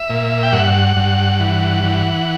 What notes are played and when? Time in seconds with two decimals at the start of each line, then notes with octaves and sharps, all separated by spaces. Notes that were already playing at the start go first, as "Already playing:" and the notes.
Already playing: E5
0.10 A#2
0.43 G5
0.52 G2 F#5
0.97 G2
1.40 E3
1.84 E3